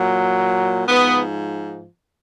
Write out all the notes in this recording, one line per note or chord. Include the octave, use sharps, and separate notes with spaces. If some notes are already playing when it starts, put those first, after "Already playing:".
Already playing: A#2 F#3
G#2 F3 B3